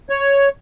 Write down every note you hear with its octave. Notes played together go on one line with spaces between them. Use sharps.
C#5